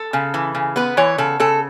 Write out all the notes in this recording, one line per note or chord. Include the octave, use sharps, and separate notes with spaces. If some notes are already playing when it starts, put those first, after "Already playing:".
Already playing: A4
C#3
E3
C#3
B3 B4
E3 C#5
C#3 A4
C#3 A4